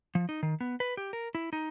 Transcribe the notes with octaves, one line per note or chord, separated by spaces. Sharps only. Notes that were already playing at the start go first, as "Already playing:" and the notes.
F3
D#4
D#3
B3
B4
G4
A#4
E4
D#4